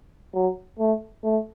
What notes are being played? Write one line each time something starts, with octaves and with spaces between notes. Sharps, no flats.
F#3
A3
A3